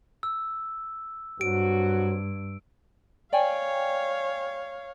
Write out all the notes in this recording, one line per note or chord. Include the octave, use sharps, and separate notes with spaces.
E6
G2 F#3 C4 F#4 D7
C#5 D5 F5 G5 G#5